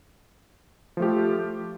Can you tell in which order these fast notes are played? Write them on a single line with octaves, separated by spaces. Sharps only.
F3 A3 G4 F4